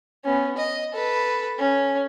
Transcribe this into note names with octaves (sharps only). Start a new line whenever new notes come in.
B3 C#4
D#5
A4 B4
C#4